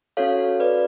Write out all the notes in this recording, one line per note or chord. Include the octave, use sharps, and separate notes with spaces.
C#4 F#4 A4 C#5 F5
B4 D5